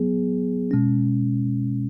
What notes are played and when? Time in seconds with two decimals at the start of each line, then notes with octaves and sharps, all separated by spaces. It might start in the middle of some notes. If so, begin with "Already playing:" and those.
Already playing: F#3 B3 G#4
0.71 B2 G#3 C#4